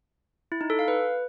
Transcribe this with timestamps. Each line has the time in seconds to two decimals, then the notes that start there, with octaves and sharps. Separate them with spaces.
0.52 E4
0.61 D#4
0.70 A4
0.79 F5
0.88 B4